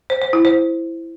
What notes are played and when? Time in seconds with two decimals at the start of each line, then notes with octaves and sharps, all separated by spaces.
0.10 C5
0.22 C5
0.33 E4
0.45 C5